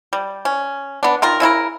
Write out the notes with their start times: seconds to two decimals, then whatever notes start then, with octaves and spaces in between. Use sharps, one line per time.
0.13 G3
0.45 C#4
1.03 B3 D4
1.22 D#3 F4 A#4
1.40 C#3 E4 F4 A#4